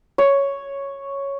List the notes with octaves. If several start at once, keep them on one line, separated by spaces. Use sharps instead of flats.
C#5